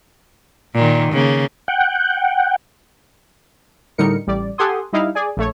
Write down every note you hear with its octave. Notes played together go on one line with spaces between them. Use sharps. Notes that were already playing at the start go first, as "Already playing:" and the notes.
A#2 D#3
C#3 A#3
F#5 G5
A2 D3 G3 D#4 A#4 C#7
A1 G3 D5
G4 A4 F#5 G#5 C6 D#6
G3 D#4 E4 F5
G#4 D5 G#5
A#1 A3 C#5